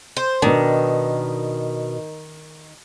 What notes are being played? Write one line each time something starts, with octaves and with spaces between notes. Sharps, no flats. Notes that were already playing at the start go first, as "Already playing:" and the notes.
C5
B2 D#3 D4